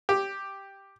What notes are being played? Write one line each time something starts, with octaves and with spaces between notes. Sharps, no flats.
G4